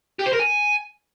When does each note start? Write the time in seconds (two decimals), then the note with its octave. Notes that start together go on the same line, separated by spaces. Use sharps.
0.19 G4
0.26 C5
0.33 A#4
0.39 G#5